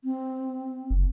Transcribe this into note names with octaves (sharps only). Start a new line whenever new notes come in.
C4
F#1